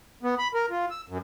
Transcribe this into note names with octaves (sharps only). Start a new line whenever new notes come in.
B3
B5
A#4
F4
E6
F#2